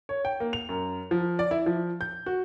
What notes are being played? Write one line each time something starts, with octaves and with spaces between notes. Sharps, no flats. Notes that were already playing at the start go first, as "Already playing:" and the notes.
C#5
G5
A#3
F7
F#2
F3
D5
E4
F3
G6
F#4